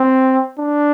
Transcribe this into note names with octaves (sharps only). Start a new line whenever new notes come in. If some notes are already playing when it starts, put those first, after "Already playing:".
Already playing: C4
D4